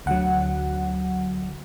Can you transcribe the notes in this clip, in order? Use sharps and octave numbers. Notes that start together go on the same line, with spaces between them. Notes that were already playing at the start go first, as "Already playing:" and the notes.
D2 D3 F#3 F#5